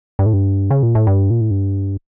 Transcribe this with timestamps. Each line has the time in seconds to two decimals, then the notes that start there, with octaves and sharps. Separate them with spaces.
0.19 G2
0.26 A2
0.33 G2
0.71 C#3
0.83 A#2
0.95 A2
1.07 G2
1.30 A#2
1.41 A2
1.51 G2